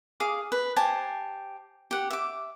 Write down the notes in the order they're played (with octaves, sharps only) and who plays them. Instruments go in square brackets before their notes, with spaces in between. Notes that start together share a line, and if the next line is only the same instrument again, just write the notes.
[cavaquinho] G#4 F5 D6
B4
G4 C5 G#5 A5
G4 F#5
E5 D6